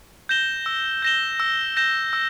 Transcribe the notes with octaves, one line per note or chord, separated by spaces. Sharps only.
G6 A#6 E7 G7
E6
G6 A#6 E7 G7
E6
G6 A#6 E7 G7
E6